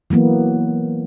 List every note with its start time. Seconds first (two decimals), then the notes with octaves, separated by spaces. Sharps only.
0.10 E3 F#3 A#3 B3